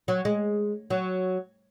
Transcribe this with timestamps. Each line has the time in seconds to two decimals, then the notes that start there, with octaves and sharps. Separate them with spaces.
0.08 F#3
0.25 G#3
0.90 F#3